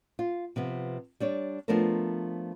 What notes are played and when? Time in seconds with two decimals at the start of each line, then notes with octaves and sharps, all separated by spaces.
0.19 F4
0.56 C3 F3 B3
1.20 G3 D4 C#5
1.68 F3 A3 B3 D4 A#4 C5